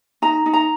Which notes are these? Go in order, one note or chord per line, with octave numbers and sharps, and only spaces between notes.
D#4 A#5
D#4
A#5